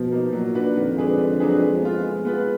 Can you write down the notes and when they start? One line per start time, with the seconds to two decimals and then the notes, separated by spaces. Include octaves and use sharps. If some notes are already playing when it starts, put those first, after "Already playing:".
Already playing: B2 F3
0.12 A#3 D#4
0.33 A#2 F#3
0.55 D4 F#4 B4
0.76 F2 D#3
0.97 G#3 D4 G#4 B4
1.18 D3
1.39 F#3 D4 G#4 B4
1.61 G#3
1.82 B3 F4
2.03 G#3
2.25 B3 F4 B4